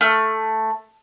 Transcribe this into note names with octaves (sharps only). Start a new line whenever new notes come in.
A3 F6